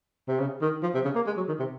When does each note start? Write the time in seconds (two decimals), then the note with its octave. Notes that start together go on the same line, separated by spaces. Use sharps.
0.28 C3
0.40 C#3
0.62 D#3
0.83 F3
0.94 C3
1.05 C#3
1.15 A#3
1.26 G#3
1.37 F#3
1.48 D#3
1.59 C3